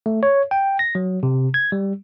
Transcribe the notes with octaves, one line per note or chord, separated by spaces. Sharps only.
A3
C#5
G5
A#6
F#3
C3
G#6
G3